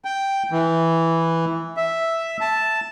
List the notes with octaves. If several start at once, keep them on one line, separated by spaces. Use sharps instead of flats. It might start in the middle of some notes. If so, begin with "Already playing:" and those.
G5
E3
E5
A5